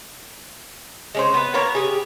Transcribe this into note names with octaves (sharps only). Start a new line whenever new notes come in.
G#3 C#4 C5
B3 B4
A#3 B3 A#4 C#5
G4 G#4